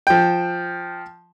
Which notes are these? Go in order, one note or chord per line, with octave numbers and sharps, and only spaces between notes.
F3 G5